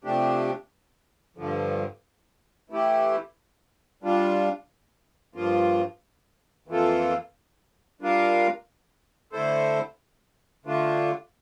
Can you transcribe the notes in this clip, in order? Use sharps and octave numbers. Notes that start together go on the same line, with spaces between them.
C3 F3 A3 D4 G4
G2 D3 F3
E3 A3 E4 G4
G3 D4 F4
G2 F3 A#3 F4
F2 E3 A#3 F4 A4
G3 D4 F4 A#4 F5
D3 A3 E4 A4 C5
D3 A3 D4 F4